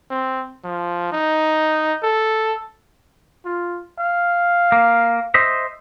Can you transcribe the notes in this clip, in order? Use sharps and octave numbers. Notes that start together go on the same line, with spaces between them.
C4
F3
D#4
A4
F4
F5
A#3
C5 D#5 E5